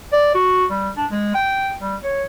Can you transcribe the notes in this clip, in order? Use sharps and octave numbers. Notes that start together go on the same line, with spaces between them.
D5
F#4
G3
D4
G#3
G5
G3
C#5